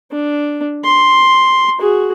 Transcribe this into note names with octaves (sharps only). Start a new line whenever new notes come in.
D4
C6
F#4 G#4